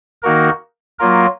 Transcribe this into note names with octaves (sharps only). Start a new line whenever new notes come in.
D#3 A#3 D#4 F#4 A#4
F#3 A#3 F4 A#4